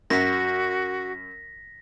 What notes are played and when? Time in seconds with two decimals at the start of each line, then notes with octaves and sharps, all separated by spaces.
0.10 F#2 F#4 A#6 B6